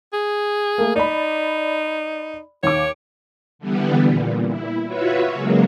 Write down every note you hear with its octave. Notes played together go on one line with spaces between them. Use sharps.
G#4
A3 A#3
D#4 D5 B5
D#2 C#5 D6
D3 E3 G3 B3
A#2
E4
F4 F#4 B4 C#5 E5
C#3 F#3 G#3 A#3